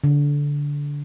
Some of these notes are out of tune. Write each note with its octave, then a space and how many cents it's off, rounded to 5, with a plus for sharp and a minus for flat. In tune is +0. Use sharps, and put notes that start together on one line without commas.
D3 -20